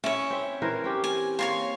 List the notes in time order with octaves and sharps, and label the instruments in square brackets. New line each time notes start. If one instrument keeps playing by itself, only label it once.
[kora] C#4 [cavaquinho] E4 C#5
[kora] C4 E5
E3 A#4 C5
C4 C#4 G4
[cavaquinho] G#5
[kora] A#3 [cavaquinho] C#5 G#5 C6